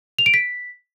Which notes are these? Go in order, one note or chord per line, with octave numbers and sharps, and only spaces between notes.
F7
D7
B6